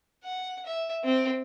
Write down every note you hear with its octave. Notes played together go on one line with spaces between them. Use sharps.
F#5
E5
C4